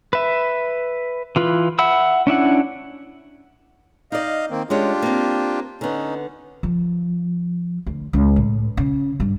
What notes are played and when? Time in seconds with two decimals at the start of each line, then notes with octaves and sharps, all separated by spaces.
0.13 B4 E5
1.36 E3 F4 B4
1.79 E5 F#5 B5 E6
2.27 C#4 D4 E4 F#5
4.12 D#4 D5 D#5 F5
4.50 D#3 A#3 C4
4.70 G#3 C#4 D4 F4 G4 C#5
5.02 A#3 C4
5.81 D3 B3 C#4 D#4
6.63 F3
7.87 D2
8.13 C#2
8.36 A2
8.77 C#3
9.20 G2